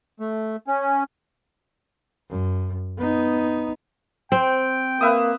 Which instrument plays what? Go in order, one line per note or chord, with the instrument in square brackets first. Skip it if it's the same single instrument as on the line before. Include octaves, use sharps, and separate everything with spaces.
[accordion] A3
C#4
[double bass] F#2
B3 D#4
[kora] C4 [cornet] G5
[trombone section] A#3 [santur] B4 E5 D#6